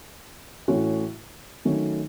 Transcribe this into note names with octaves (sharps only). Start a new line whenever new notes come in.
A2 E3 A3 C#4 F#4
D#3 F#3 A3 C#4